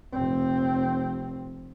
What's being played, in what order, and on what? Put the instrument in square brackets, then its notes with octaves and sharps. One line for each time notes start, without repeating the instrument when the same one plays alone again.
[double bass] F1 C4